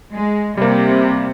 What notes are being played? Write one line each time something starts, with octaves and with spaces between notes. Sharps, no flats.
G#3
C3 G3 A#3